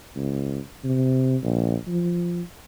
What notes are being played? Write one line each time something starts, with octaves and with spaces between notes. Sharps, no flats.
C#2
C3
A#1
F3